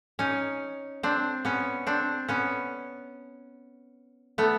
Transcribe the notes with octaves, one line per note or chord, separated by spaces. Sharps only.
C#4 D#4
C4 D4
B3 C#4
C4 D4
B3 C#4
A3 B3